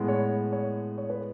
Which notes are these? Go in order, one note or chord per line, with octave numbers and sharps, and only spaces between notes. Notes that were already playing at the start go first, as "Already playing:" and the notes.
Already playing: A2 G#3 B3
C#5
C#5
C#5
B4